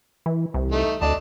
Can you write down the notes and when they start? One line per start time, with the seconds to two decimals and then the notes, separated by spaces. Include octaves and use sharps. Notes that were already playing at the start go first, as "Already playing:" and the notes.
0.26 E3
0.54 C2
0.72 A3 D#4
1.02 D2 D5 D#5 A5